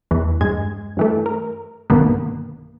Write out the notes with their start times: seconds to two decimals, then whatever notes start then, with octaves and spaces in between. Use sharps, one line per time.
0.11 E2 E3
0.41 G2 G#3 G#6
0.97 G2 E3 A3
1.26 A#4
1.90 B1 G2 D3 D#3 A#3 B3